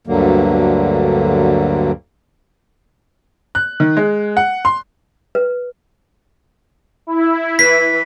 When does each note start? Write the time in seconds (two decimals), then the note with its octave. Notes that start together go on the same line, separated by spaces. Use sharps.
0.07 D2 G2 D3 F#3 A#3
3.55 F#6
3.80 D#3
3.97 G#3
4.37 F#5
4.65 C6
5.35 B4
7.07 E4
7.59 E3 B4 B6